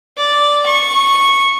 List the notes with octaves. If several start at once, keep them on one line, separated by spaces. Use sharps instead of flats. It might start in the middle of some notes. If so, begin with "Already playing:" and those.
D5
C#6